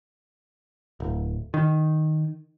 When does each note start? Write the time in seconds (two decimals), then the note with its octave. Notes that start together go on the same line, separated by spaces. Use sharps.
1.00 D1
1.54 D#3